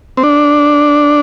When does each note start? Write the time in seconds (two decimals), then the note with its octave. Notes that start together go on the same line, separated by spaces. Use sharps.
0.17 C4
0.23 D4